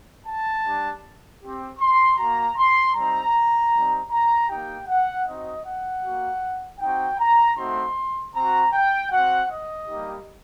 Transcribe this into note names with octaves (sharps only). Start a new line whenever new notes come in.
A5
G3 D4 G4
C4 G4
C6
A#3 F#4 A#5
C6
G3 C4 D#4 A#5
G3 C4 D#4
A#5
A#3 D#4 G4 G5
F#5
C4 D#4 F#4 D#5
F#5
A#3 F#4
C4 D#4 F#4 G5
A#5
A3 C4 D#4 F#4 C6
C4 F#4 A#5
G5
C4 F#4 F#5
D#5
G3 A#3 D#4 G4